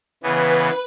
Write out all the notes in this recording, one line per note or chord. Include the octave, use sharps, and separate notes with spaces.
C#3 E3 B3 B4